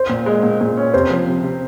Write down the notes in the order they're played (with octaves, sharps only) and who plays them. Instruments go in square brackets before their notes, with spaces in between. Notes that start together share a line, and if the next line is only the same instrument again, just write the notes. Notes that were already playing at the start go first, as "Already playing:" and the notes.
Already playing: [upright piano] C5
[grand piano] A#2
G#3
A#2
A#2
C#4
[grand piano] C3 [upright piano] C5
[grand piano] F3
C3
C3